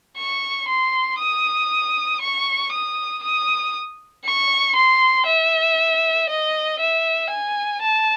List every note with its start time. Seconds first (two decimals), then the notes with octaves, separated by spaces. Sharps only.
0.17 C#6
0.68 C6
1.19 D#6
2.21 C#6
2.72 D#6
3.23 D#6
4.25 C#6
4.75 C6
5.26 E5
6.29 D#5
6.80 E5
7.30 G#5
7.82 A5